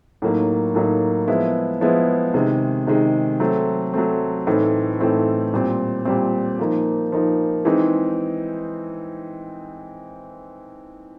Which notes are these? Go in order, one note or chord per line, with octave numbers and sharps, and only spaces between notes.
A2 F#3 A#3 D#4
A2 F#3 A#3 D#4
F3 G#3 B3 E4
F3 G#3 B3 E4
C3 D#3 G#3
C3 D#3 G#3
F#3 A3 C4
F#3 A3 C4
A2 E3 A3 C4 D#4
A2 E3 A3 C4 D#4
A#2 G3 C4
A#2 G3 C4
F3 A#3 D#4
F3 A#3 D#4
E3 G#3 C4 D#4